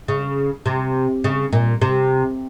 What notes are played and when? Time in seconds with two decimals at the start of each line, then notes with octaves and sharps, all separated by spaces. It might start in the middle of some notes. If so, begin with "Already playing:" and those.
0.08 C#3
0.66 C3
1.24 C#3
1.53 A#2
1.82 C3